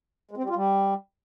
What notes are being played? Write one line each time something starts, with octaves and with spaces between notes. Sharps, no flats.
G#3
C4
G3
F4
G3